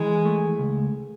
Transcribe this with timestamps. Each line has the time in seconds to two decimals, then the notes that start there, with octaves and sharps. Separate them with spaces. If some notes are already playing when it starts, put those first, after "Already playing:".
Already playing: E3 G#3
0.25 A3
0.58 C#2